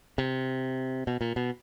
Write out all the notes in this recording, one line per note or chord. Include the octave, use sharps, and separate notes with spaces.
C3
B2
A#2
B2